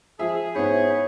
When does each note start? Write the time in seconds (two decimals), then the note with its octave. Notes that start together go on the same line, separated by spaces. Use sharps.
0.19 F3 F4 G#4 E5
0.55 G#2 B3 E4 C5 C#5 E5